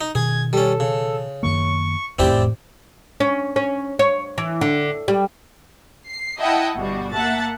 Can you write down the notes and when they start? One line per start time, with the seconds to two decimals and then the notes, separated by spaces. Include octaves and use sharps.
0.01 D#4
0.15 B2 D#3 G#4 G#6
0.53 G3 C#4 A4
0.80 C#3
1.43 F#2 D#3 A#3 C#6
2.19 F1 E2 A2 C4 E4 G4 D5
3.20 C#4
3.56 C#4
3.99 C#5
4.38 E3
4.61 D3
5.08 G3
6.06 C7
6.40 E4 D#5 E5 F#5 G5 A5
6.77 G1 B2 G3 F#4
7.12 A#3 E5 F#5 A5 A6